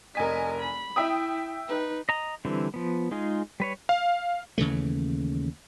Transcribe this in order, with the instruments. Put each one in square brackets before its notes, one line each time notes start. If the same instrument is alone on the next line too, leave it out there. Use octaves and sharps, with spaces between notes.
[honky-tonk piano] F1 G#5 B6 [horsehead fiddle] A#4 D#5
[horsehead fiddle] B5
[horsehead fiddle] E4 [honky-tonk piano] E5 G5 D#6
[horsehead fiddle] D#4 B4
[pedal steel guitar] D#5 A#5
D3 E3 G3 C4
F3 B3
G#3 D#4 F4 G#4
G3 B4 C#5
[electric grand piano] F5
[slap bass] D#2 C#3 E3 A3